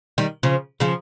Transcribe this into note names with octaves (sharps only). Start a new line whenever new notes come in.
D#3 G3
C#3 F3
C#3 F3